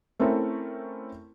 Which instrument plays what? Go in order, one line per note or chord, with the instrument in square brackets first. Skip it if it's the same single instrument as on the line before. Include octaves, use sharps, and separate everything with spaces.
[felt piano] A3 C4 C#4 E4 A4 A#4